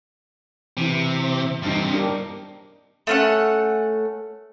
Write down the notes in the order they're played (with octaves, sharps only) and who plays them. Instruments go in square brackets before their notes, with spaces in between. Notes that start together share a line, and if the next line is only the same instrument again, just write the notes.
[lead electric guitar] C3 [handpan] E3 E4
[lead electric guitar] G2 C4 [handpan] G3 D#4
[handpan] D4 G4 A#4
[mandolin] A3 C#4 F#5